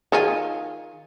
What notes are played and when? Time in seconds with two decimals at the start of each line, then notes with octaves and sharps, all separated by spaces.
0.12 D#3 F4 G#4